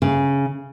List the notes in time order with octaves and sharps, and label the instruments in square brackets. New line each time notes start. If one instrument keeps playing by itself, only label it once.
[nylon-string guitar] C#3